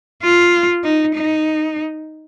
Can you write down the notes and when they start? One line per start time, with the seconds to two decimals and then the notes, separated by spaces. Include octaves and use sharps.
0.23 F4
0.84 D#4
1.15 D#4